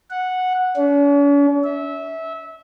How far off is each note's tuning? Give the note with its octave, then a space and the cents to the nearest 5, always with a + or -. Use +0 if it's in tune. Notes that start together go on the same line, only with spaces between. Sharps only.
F#5 -10
C#4 +45
E5 -20